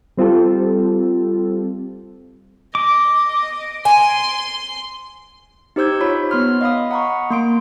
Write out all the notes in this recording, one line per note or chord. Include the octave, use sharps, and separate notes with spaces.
G3 C4 F4 G4 A4
D#5 D6
G#5 C6
D#4 G4 C5 E6 G6 G#6
F4 C#5 B5
B3 C#5 C6 F6
D#5 F5 B5 D#6
F#5 A#5 B5 C#6
A#3 C6 D7